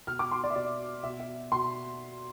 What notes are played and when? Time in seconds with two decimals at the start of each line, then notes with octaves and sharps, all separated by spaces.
0.07 B2 F6
0.19 D6
0.31 C6
0.44 D5
0.50 E5
0.55 B2 D5
1.03 B2 E5
1.20 E5
1.51 B2 C6